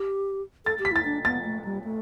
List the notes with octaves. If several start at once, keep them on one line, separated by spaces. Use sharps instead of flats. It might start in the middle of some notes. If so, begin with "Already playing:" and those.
Already playing: G4
A4 A6
G4
B6
E4 A6
D4
B3 A6
A3
G3
A3